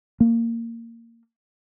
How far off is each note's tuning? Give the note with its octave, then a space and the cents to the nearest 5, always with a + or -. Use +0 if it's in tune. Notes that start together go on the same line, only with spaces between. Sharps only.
A#3 -15